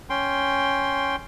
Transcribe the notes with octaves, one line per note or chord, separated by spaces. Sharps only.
C#4 G5 C6